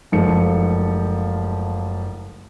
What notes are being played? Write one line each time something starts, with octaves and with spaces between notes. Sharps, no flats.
F#1 G#2 F3 A3 C#7